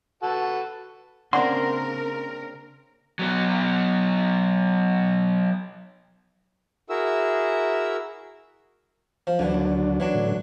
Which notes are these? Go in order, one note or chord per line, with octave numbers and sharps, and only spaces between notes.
F#4 A4 B4
C#3 A#3 C4 D4 A#4 F#5 C6
F#3 B3
E4 F#4 G#4 A#4 E5 E6
F3
D2 D3 E3 F#3 D4
D#2
E3 F#3 D4
A2 D3